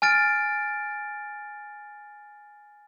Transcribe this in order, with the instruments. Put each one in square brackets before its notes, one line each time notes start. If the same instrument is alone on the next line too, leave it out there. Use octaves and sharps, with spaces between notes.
[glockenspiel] G#5 F6 A6 D7